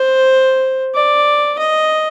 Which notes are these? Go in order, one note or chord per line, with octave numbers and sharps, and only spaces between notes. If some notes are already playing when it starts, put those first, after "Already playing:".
Already playing: C5
D5
D#5